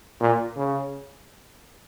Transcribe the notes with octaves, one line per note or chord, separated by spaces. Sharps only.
A#2
C#3